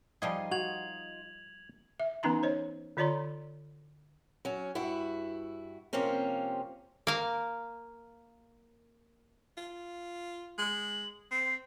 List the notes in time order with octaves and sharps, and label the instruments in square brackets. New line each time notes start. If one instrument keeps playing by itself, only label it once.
[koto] F3 G3 G#4 [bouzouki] D#4 F4 D#5
[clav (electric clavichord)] F#4 [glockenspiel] G#6 F7 F#7
[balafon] E5
E3 B3 C#4 D#4 A#5 C6
C5 C#5 D#5
D3 F4 C#5 D5 A#5 C6
[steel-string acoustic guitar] F#3 C#4
G2 E4 F#4
C3 F3 A#3 C4 C#4
[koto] A#3 F5
[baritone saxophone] F4
[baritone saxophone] G#3 [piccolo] F#7
[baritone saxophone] C4 [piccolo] C7